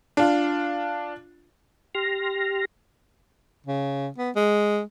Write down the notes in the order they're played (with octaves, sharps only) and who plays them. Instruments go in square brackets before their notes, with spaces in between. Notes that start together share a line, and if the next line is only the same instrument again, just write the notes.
[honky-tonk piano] D4 F4
[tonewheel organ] G4 C6 F6 A#6
[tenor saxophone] C#3
B3
G#3